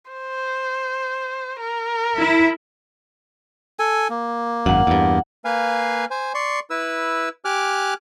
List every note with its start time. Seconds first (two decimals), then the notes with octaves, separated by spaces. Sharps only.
0.11 C5
1.60 A#4
2.16 E4
3.79 A4 G#5
4.10 A#3
4.66 G#1 F#2 F#5
4.87 E2 G2
5.45 A#3 B4 F5 G#5
6.11 C5 G#5
6.34 D5 C6 C#6
6.70 E4 B4 E6
7.45 G4 G#5 D6 F6 F#6